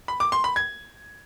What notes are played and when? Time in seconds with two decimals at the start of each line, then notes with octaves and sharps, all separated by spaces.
0.08 B5
0.20 D6
0.32 C6
0.44 B5
0.56 G#6